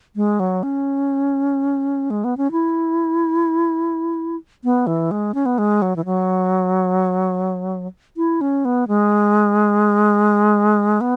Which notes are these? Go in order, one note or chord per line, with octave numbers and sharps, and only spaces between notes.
G#3
F#3
C#4
G#3
B3
C#4
E4
B3
E3
G#3
C#4
B3
G#3
F#3
E3
F#3
E4
C#4
B3
G#3
B3